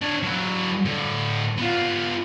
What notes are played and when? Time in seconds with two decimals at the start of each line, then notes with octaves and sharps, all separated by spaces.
0.02 D4 C#5
0.23 F#3 E4
0.85 A2 D3
1.57 B3 F4